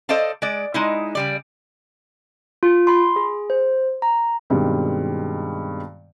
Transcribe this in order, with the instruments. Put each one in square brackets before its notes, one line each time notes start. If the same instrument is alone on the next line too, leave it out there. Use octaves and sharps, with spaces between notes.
[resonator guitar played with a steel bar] A4 C5 D5 D#5 F5 A5
G#3 D5
G#3 D#4 E4
C#3 G3 D5
[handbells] F4
B5 C6
G#4
C5
A#5
[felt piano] G2 B2 D#3 G3 G#3 C4